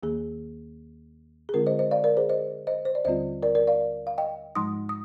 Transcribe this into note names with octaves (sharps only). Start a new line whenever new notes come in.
D#2 D#3 A#3 G#4
G#4
D3 G#3 C4 F4 A#4
C5 D#5
C5 D#5
D5 F5
A#4 D5
G#4 C5
C5 D#5
C5 D#5
C5
D5
D#2 D3 G3 C4 F4 C5 D#5
A#4 D5
A#4 D5
D5 F5
F5
D#5 G5
G#2 F3 G#3 D#4 C6 D#6
D#6